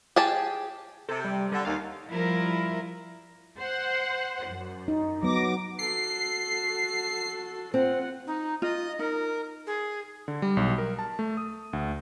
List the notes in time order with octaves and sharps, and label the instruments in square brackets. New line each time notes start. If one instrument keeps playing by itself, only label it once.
[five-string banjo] G4 G#4 A5
[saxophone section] C3 [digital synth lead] A4
[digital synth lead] G3
[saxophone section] D3 [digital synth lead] G3
[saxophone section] D#2 [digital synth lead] F5
[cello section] F3 G3 E4 F4 A#4
[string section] C5 F#5
F#2
[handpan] D#4
[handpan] F#3 B3 [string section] D6 A#6
[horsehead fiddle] F#4 A4 [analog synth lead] C7
[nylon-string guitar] C4 [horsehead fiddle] F4 F#5
[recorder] D#4
[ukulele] F4 [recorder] D#5
[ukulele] D#4 [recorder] A#4
[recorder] G#4
[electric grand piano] D3
G3
B1
A#4
A5
A3
D#6
D2